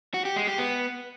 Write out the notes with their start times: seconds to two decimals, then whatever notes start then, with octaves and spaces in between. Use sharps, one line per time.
0.14 F#4
0.25 G4
0.36 G#3
0.47 G4
0.58 B3